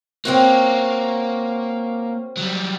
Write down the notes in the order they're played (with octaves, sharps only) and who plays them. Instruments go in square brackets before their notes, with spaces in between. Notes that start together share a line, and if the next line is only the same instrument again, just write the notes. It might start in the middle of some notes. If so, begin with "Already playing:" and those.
[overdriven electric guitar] A#3 [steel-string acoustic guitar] C4 C#4 F#4
[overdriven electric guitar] F#3 G3